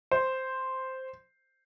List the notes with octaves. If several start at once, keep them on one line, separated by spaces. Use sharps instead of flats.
C5